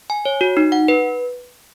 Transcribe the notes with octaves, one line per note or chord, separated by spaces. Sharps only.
G#5
C#5
F#4
D#4
F#5
B4